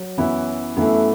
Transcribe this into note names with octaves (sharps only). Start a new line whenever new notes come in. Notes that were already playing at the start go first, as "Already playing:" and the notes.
Already playing: F#3
F#2 E3 B3 E4
F#2 E3 A3 B3 E4